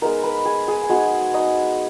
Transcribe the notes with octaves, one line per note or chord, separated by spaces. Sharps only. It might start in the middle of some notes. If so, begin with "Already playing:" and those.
G#3 B3 D#4 A#4 A#5
B4 B5
G#4 G#5
G#4 G#5
G#5
G#3 B3 D#4 F#4 F#5
D#4 D#5